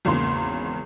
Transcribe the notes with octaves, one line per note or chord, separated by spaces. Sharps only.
G#1 E2 C#3 A#3 C6